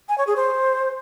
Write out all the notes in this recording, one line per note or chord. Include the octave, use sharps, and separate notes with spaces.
G#5
C#5
G#4
C5